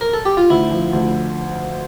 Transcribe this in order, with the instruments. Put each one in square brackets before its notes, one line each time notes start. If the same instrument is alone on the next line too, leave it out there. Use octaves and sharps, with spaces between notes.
[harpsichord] A#4
A4
G4
F4
[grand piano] D2 [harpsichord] E4
[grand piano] F3
D2